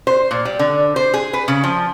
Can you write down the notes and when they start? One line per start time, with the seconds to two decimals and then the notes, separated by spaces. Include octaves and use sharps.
0.07 C5
0.31 A#2
0.45 G3
0.59 D3
0.96 C5
1.14 G#4
1.33 B4
1.48 C#3
1.64 F3